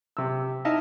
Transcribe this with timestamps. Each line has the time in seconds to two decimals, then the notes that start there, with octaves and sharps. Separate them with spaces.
0.17 C3 E6
0.65 D#4 E4 D#5 E5 A5 F6